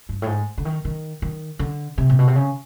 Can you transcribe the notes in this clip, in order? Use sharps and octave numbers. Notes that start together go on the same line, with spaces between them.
G2
A2
G#2
D3
D#3
D#3
D#3
D3
C3
A#2
B2
C3
C#3